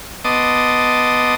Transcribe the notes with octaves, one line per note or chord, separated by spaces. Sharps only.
B3 D#5 A5 C6 D6 D#6